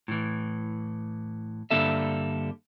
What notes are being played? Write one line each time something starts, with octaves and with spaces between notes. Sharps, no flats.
A2 E3
G2 D3 G3 A#3 A4 E5